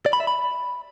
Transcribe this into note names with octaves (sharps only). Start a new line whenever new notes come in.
D5
B5
E5
B5